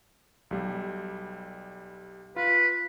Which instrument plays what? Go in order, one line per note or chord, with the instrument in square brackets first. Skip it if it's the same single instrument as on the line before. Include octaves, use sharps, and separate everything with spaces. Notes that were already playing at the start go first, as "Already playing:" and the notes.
[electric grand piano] B1 G3
[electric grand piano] F4 [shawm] B4